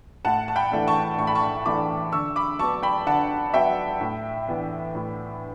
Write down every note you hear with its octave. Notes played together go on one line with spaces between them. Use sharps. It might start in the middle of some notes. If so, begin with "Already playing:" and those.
A2 F#5 A5
A5
G5 B5
E3 A3 D4
A5 C#6
A2 C#6
B5
A5 C#6
E3 A3 D4 B5 D6
D3 C#6 E6
B5 D6
F#3 B3 A5 C#6
G5 B5
D3 F#5 A5
F#3 B3 E5 G5
A2
E3 B3 D4
A2